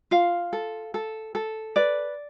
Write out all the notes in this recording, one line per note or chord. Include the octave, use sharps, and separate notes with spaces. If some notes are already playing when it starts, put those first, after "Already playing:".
F4 F5
A4
A4
A4
B4 D5